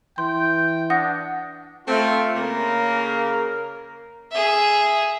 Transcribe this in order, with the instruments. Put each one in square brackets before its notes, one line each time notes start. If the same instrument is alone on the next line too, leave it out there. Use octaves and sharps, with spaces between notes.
[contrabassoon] E3 [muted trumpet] G5 [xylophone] C6
[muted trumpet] D4 [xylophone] F#5 D#6 A#6
[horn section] A3 C4 [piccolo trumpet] F4
[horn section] C#3 A#3 [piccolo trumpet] A#4
[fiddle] G#4 E5